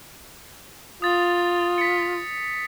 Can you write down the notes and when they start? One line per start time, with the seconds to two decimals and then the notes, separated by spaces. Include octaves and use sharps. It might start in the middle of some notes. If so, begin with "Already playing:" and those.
1.02 F4 D#6 A6
1.78 B6 C#7